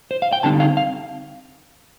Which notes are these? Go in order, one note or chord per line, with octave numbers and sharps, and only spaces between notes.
C5
F5
G5
D3 G3 C4 D#4 A5
F5
F5